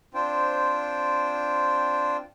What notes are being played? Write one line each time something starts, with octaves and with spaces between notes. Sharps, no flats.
C4 D4 F4 C5 G5